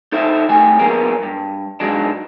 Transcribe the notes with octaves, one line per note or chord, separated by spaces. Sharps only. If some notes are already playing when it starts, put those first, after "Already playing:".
D#4 A4 C5 E5
D#3 G3 A3 G#5
F#3 A#3 B3 C#4 G#4 A#4
G2
G#2 F#3 G#3 D4